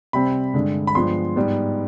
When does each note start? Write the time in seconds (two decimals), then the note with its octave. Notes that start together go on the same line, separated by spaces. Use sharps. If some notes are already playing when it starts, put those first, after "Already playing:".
0.13 C3 G3 C4 B5
0.54 G2 D3 G#3
0.87 B5
0.95 G2 F3 G#3 B3 C6
1.36 G#2 G3 B3